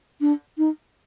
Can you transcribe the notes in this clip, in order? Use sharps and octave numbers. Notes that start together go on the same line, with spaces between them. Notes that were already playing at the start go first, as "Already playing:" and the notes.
D4
D#4